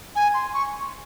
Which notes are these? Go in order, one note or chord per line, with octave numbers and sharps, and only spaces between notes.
G#5
C6
C#6